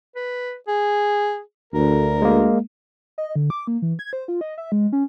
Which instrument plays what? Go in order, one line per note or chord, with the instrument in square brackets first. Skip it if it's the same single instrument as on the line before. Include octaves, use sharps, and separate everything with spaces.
[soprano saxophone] B4
G#4
[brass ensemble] D2 [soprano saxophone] A#4
[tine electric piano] G#3 A#3
[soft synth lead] D#5
D3
D6
A#3
E3
G#6
C5
F4
D#5
E5
G#3
C#4